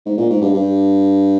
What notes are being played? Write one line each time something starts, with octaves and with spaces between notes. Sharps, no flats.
G#2
A#2
G#2
G2
G2